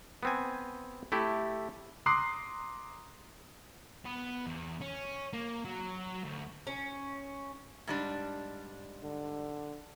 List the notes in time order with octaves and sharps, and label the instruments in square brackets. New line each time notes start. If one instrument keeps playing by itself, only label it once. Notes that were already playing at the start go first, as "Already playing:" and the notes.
[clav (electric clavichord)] B3 C4 G#5
A3 E4 G4
[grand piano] A#5 C6 D6 D#6 F#6 C7
[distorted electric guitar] B3
E2
C#4
A#3
F#3
D2
[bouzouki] C#4
[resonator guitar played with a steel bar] G#2 G3 D4
[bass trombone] D3